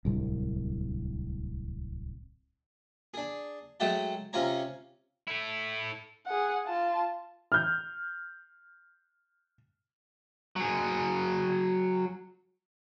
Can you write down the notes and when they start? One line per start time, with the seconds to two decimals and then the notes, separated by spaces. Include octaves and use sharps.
0.05 D1 C2
3.14 D4 G#4
3.80 F#3 G#3 A3 F#5 G5 A5
4.33 C3 C#4 F4 C#5 G#5 A#5
5.27 E4 A4
6.26 G#4 F#5
6.67 F4 A5
7.52 F6 G6
10.56 F#3 G#4